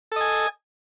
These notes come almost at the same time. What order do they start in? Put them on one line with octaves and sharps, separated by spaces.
A4 D#5 G#5